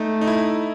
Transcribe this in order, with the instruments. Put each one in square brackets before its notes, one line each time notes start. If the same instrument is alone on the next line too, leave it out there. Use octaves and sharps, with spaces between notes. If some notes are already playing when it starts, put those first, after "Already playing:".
Already playing: [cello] A3 [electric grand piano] D#4
[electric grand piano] D#4
E4